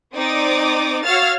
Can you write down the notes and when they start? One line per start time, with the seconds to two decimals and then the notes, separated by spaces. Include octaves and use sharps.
0.14 C4 D#4 D5 D6 D#6
1.03 F#4 C#5 F5 E6 F6 A6